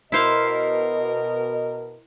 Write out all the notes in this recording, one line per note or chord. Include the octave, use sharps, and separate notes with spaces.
B2 E4 A#4 C5 D#5 F5